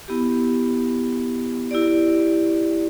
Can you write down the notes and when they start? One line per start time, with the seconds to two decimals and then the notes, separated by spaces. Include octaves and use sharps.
0.08 B3 E4 G4
1.71 E4 G4 D5